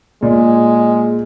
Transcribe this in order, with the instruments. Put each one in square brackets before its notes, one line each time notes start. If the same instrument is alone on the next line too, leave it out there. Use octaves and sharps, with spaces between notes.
[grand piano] A#2 [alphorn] G#3